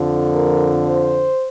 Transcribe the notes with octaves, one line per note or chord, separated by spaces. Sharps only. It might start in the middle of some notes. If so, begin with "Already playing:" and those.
Already playing: F2 D3 F3
A#4
C5